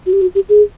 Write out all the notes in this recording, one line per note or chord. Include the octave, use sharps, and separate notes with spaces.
F#4
G4
F#4
G4
G#4